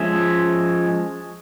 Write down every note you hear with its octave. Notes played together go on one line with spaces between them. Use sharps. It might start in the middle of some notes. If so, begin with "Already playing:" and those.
Already playing: F3 G#3 C#4 E5